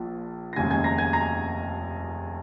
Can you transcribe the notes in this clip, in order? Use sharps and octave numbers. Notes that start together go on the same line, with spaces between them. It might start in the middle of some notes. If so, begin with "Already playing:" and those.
Already playing: A#1 A#2 F3
A#6
F1 D#2 C#3 G#3 G#5 G#6
G#5 G#6
A#5 A#6
G#5 G#6
A#5 A#6